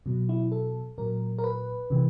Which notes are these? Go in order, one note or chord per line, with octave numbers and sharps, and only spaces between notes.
B2 F#3
E4
A4
A#2 F#3 A#4
A#4
B4
C3 E3